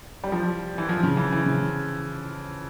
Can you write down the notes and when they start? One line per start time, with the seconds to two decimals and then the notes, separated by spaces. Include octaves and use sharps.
0.24 G3
0.32 F3
0.78 E3
0.89 F3
1.03 C#3
1.17 E3
1.32 E3
1.46 C#3